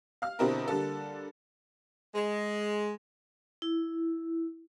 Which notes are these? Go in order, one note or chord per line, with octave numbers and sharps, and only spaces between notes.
F5 F6
B2 D3 C4 E4 G4 A#4
D3 G3 A#3 A4
G#3
E4